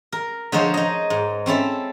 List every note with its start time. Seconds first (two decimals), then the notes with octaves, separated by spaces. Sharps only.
0.12 A#4
0.52 D3 F3 D#4 G#4 C5 C#5
0.74 D#4 D#5
1.10 G#2
1.46 C4 C#4 E4 A4